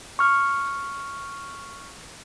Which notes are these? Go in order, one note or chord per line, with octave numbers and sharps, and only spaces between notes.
C#6 F6